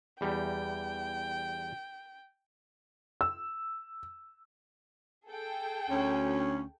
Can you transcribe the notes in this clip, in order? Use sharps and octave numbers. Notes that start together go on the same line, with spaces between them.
E2 G3 G5
E6
G#4 A4 G5
D2 C#4